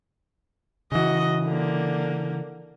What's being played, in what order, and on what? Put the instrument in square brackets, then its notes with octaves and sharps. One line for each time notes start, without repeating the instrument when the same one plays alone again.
[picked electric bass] C#3 E3 [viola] F#4 D#5
[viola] D3 A#3